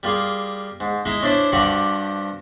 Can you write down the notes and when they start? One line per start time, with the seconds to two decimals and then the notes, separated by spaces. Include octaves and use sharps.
0.03 G3 A#3 F4 G#4
0.80 G#2
1.05 G#3 D#4 E4
1.22 C#4 D4 E4 C5 D5
1.53 G2 F3 F#4 G4 F#5 D6